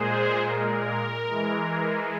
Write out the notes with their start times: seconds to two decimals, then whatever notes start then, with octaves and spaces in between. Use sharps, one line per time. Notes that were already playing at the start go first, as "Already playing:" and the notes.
Already playing: A#2 G#3 G#4 C5
0.46 A#4
1.29 E3 G#3